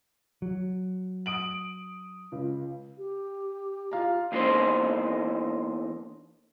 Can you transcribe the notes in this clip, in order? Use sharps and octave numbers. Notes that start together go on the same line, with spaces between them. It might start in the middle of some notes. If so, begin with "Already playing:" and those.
F#3
D#6 D7 F#7
C#2
G4
F4 F5 A#5
E2 A#3 D4 D#4 C5